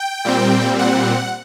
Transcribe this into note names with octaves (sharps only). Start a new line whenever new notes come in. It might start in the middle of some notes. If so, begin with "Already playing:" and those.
Already playing: G5
A#2 G3 C4
F#5